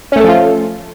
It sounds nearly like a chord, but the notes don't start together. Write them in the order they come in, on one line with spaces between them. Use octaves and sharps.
C#4 A3 A4 F3 F4